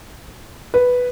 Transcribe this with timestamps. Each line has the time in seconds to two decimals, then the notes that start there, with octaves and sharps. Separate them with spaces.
0.74 B4